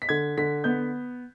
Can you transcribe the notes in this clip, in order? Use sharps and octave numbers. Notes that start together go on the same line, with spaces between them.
B6
D3 G#6
D3 B6
B3 G6